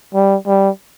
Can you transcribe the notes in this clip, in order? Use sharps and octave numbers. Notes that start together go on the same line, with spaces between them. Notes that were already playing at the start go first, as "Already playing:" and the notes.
G3
G3